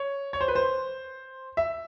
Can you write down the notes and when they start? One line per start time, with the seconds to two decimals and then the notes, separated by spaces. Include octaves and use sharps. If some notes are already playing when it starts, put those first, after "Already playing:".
Already playing: C#5
0.33 C#5
0.41 C5
0.48 B4
0.55 C5
1.57 E5